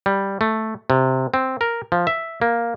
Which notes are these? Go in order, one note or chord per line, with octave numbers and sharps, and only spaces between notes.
G3
A3
C3
C4
A#4
F3
E5
A#3